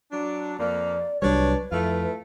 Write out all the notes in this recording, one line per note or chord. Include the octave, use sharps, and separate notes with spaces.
F#3 D4
F2 A#3 D5
C2 F#3 G3 D4 B4 C#5
F2 A3 E4 F4